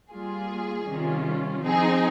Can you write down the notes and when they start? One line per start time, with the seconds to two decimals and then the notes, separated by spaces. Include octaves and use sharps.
0.10 G3 A#3 F4 G#4
0.87 C3 D#3 G3 C#4 F4
1.63 F3 C4 D#4 G#4